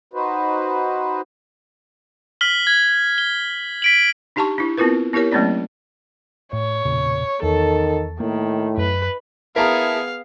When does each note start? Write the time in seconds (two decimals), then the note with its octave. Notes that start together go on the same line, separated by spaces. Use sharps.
0.14 D#4 F#4 B4 C5
2.41 F6 B6 F#7 G7
2.67 G#6
3.18 G7
3.82 B6 D7 F#7
4.36 D4 D#4 G4 A5 A#5 C#6
4.58 D4 E4
4.78 B3 C4 E4 F4 A#4 B4
5.13 B3 E4 G4 A#4 C#5
5.32 F#3 A3 A#3 C4 C#4 D5
6.53 A2 C#5
6.85 E1 A#2 C#3
7.43 E2 D#3 A4
8.20 A2 D#3 A#3
8.77 F#2 B4
9.56 B3 E4 G#4 A#4 F5 A5 A#5